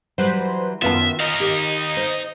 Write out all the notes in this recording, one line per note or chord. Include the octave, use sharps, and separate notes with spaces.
E3 F#3 G3 B4 C5
F#2 D#3 B3 F4 E5 A5
D#4 D#5 F5
D#3 G4
C5